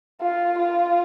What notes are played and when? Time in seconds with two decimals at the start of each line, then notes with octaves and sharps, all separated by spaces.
0.22 F4
0.58 F4